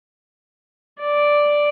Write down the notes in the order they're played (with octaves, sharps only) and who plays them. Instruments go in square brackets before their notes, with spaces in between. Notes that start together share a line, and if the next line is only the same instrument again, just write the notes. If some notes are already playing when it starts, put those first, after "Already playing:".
[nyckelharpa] D5